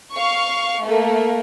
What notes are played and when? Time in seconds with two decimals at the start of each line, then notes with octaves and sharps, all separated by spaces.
0.13 F5 C#6
0.85 A3 A#3